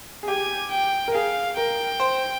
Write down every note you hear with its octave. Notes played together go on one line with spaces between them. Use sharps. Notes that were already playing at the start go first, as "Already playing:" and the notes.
G#4
G4 G#5
G5
A#4
G#4 F5
A#4 G5
C5